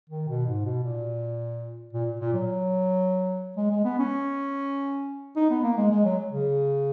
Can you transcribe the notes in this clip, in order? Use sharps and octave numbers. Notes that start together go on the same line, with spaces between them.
D#3
B2
G#2
B2
A#2
A#2
A#2
F#3
G#3
G#3
B3
C#4
D#4
B3
A#3
G#3
G#3
F#3
C#3